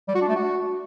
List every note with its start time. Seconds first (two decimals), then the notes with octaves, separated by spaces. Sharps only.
0.08 G3
0.15 F#4
0.22 D4
0.28 A3
0.35 F#4